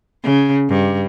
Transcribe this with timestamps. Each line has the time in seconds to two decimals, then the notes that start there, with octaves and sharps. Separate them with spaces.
0.24 C#3
0.69 G2